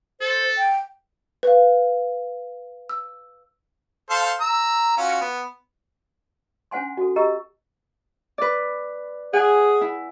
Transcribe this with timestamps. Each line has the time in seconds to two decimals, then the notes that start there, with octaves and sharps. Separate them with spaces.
0.21 A4 C5
0.58 G5
1.43 B4 F5
2.89 E6
4.10 A4 C5 F5
4.40 A#5 E6
4.97 C#4 F4 F#4
5.21 B3
6.71 C#4 D4 C5 F#5 G#5 C6
6.97 F#4 A4
7.16 G4 D#5 A#5 E6
8.38 B4 D5
9.33 G#4 F#5 G#5
9.81 E4